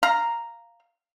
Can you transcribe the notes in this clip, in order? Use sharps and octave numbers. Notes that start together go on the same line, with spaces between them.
F5 A#5